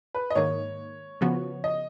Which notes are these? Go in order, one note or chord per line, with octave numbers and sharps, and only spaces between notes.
B4
D#5
G#2 D#3 A#3 C#5
C#3 F3 B3 F#4
D#5